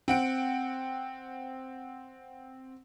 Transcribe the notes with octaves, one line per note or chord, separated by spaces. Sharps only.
C4 F#5 D7